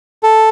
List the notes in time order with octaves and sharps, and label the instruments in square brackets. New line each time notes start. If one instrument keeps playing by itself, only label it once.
[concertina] A4